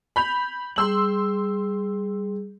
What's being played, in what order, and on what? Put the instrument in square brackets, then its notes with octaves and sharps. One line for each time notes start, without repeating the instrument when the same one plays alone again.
[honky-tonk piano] B5 G6 F7
[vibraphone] G3 G#4 [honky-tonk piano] C6 E6 F#7